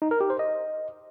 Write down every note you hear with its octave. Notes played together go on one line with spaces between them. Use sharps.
D#4
A#4
G4
C5
D#5